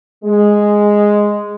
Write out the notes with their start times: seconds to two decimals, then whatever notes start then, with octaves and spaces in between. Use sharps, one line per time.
0.24 G#3